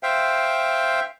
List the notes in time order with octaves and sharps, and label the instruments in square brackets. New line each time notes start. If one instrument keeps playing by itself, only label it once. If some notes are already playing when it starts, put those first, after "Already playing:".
[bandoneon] C5 E5 F5 G5